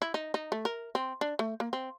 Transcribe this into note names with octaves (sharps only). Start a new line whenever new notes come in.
E4
D#4
D#4
A3
A#4
C4
D4
A3
A#3
C4